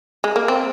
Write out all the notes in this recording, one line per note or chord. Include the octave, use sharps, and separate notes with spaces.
G#3
A#3
C4